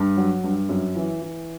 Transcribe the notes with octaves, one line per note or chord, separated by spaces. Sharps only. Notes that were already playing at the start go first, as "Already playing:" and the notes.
Already playing: G2
F#3
G2
F#2
E3
E3